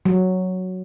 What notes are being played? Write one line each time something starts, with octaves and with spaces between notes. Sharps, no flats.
F#3